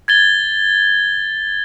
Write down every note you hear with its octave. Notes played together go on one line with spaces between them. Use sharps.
G#6 A6 G7